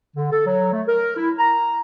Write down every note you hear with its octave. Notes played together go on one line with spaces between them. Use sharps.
D3
A4
F#3
A3
A#4
E4
A#5